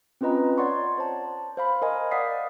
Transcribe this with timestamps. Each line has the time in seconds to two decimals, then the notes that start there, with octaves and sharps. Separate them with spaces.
0.21 C4 C#4 F4 B4 D#5 A#5
0.58 C#5 D5 F#5 C6 C#6
0.98 C5 A5
1.57 C5 F5 B5
1.82 A#4 C5 D#5 G#5
2.11 D5 F5 F#5 D#6 B6 C7